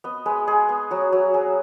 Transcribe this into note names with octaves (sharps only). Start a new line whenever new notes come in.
B3 D#5
G#3 B4
G#3 G#4
B3
F#3 F#4
F#3
F#3 G#4